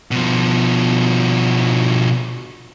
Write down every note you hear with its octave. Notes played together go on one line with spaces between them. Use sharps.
B2 F3